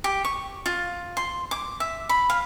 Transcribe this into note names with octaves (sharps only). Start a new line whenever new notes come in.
G4
C#6
F4
C6
D6
E5
B5
F5